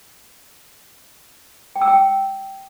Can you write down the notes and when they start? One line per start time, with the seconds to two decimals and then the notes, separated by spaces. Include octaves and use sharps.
1.76 G5
1.82 E6
1.88 G5